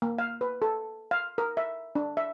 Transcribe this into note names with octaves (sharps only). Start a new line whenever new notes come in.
A#3
F5
B4
A4
F5
A#4
E5
D4
E5